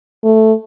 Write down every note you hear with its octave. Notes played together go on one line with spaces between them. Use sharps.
A3